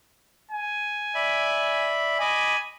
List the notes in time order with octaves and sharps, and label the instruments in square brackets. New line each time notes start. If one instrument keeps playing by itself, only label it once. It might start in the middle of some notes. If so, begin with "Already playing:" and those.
[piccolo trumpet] G#5
[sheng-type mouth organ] D5 E5 B5
[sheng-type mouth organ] D#5 B5 D6 [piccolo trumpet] G#5